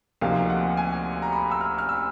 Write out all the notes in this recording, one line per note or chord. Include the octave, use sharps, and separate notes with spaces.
D2 C3 F3 A#3 D#4 F5
F#5
G#5
A#5
B5
E6
F6
F6
E6